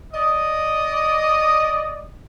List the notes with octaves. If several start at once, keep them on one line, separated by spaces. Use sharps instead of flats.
D5 D#5